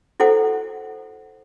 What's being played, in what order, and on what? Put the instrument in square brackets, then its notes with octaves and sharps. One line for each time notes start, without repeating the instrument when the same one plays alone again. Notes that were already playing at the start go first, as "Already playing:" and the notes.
[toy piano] E4 F#4 A4 C5 F#5